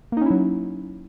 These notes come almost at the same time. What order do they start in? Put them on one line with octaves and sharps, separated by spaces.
A#3 D#4 C#4 E4 F#3